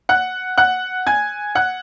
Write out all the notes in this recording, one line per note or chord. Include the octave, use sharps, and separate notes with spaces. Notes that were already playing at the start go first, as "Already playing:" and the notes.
F#5 F#6
F#5 F#6
G#5 G#6
F#5 F#6